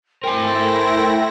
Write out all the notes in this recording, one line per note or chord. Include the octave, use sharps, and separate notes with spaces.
A3 E4 A#4 C5 G5 G#5 A#6